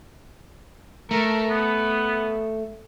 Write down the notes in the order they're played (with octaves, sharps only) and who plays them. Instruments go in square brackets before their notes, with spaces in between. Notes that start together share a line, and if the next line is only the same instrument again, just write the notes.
[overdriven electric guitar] A3 [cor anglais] A#4
[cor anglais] B3